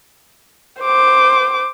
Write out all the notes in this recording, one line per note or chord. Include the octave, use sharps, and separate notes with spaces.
C5 D6